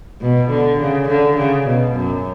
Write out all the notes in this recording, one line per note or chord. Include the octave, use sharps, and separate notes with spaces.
B2
D3
C#3
D3
C#3
B2
F#2